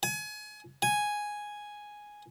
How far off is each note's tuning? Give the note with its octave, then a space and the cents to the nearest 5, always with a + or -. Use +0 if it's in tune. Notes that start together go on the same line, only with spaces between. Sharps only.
G#5 +30
G#5 +0